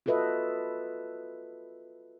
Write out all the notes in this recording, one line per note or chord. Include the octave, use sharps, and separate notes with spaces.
F4 F#4 A4 B4 D#5 E5